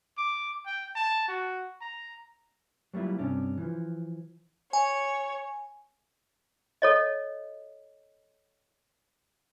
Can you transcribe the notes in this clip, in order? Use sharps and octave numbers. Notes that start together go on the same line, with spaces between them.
D6
G5
A5
F#4
A#5
F#3 G3 A#3 E4 F4
G2 C3 C#4 D4
E3 F3
C#5 G#5
A4 C#5 D#5